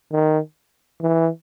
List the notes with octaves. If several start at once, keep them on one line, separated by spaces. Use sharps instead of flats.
D#3
E3